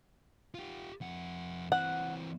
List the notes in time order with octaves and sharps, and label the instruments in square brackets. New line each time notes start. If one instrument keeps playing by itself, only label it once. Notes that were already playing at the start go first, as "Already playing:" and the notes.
[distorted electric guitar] F4 G4
F2 F#5
[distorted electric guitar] E3 C4 [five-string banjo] F#5